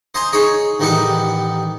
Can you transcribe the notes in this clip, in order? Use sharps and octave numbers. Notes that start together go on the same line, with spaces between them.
C5 D#5 G#5 A#5 C6
D#4 G#4 C#5 D#5
A1 D#3 G3 D#4 B4 F#5